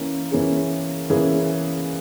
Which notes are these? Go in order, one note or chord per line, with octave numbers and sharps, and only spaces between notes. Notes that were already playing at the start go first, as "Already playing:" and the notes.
Already playing: E3 A#3 C#4
E3 A#3 C#4 G#4
E3 A#3 C#4 G#4